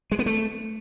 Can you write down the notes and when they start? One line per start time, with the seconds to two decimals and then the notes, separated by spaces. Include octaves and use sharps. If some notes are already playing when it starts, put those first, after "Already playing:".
0.12 G#3
0.19 B3
0.26 A3